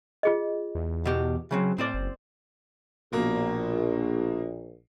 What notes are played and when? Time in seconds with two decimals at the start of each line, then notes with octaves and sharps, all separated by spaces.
0.23 F4 G#4 D#5
0.75 E2
1.06 B2 G4
1.51 C#3 F#3 C4
1.78 A2 C4 C5 D5
1.94 F#1
3.12 A#1 B2 A#3